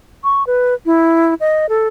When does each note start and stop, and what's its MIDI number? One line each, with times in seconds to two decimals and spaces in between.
0.24 0.46 85
0.47 0.74 71
0.86 1.34 64
1.40 1.66 75
1.69 1.88 69